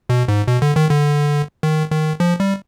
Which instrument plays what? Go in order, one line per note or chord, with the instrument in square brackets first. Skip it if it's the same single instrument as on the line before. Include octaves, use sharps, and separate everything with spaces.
[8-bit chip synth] B2
G#2
B2
D3
D#3
D3
D#3
D#3
F3
G3